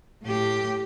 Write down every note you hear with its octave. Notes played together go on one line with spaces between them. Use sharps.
A2 G4